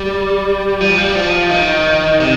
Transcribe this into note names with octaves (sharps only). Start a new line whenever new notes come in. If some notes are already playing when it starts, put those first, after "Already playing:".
Already playing: G3
F3
G3
F3
D#3
C3